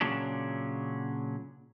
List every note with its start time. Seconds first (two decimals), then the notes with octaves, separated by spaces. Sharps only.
0.01 A#2 C#3 F#3 C#4 D4